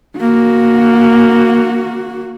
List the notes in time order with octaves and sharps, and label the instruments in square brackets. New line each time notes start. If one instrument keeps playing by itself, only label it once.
[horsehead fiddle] A#3 F#4